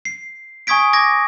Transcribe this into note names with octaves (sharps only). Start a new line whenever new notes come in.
C7
G#5 C#6 D#6 G#6 B6 D7
D6 G#6 A#6